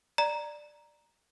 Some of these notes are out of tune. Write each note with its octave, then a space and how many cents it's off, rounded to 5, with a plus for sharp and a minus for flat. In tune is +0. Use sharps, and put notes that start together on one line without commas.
D5 +10 A#5 +0